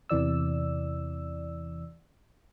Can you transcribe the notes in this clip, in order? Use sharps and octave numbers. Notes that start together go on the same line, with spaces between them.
E2 C3 E3 D5 E6